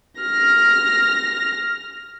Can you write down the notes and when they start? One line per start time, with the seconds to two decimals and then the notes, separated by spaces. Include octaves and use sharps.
0.21 F6 A#6